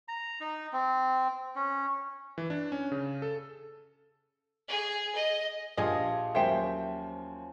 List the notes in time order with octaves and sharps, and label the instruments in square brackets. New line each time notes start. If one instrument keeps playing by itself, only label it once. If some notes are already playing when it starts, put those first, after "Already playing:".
[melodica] A#5
D#4
C4
C#4
[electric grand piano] E3
D4
C#4
C#3
A4
[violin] G#4
D#5
[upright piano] A#1 G4 G#6 [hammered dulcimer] F3 [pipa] F4 G#4 D#5
[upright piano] D#2 F#3 A#3 [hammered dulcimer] C#4 [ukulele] C5 E5 G5